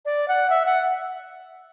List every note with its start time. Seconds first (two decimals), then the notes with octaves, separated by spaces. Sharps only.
0.05 D5
0.28 F#5
0.50 E5
0.66 F#5